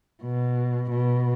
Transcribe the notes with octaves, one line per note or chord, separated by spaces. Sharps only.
B2
B2